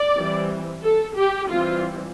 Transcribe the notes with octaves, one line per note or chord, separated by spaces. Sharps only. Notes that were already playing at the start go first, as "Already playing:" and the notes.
Already playing: D5
E3 G3 C4
A4
G4
E3 G3 C4 F4